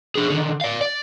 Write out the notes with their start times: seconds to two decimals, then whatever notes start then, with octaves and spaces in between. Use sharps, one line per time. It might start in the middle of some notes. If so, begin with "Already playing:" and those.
0.15 D4 G#4
0.30 D3 D#3
0.61 D5 F5
0.81 D5